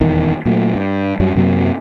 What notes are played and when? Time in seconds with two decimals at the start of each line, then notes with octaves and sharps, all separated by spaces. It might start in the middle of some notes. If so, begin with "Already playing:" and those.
0.01 D#1 E2 D#3
0.46 A#2 F#3 A3
0.75 G2
1.20 F#2 F#3 G3
1.36 F#2 C3 F#3 A#3